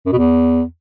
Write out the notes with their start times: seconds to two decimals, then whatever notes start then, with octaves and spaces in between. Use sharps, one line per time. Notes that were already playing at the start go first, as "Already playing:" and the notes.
0.06 F#2
0.12 B2
0.18 E2